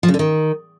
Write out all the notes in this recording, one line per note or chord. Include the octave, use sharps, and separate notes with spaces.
F3
C#3
D3
D#3